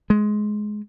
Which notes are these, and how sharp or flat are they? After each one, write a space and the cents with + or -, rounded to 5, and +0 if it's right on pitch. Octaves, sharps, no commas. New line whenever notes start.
G#3 +15